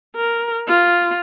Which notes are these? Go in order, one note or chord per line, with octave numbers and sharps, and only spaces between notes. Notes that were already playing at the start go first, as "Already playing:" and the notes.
A#4
F4